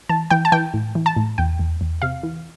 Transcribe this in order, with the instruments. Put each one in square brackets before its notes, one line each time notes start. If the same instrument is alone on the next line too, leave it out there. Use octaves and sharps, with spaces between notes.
[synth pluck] E3 A5
E3 G5
A5
E3 G5
A2
E3
A5
A2
E2 G5
E2
E2
C3 F5
E3